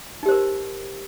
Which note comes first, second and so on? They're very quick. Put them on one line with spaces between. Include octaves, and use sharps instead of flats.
D#4 G4 C5 A#4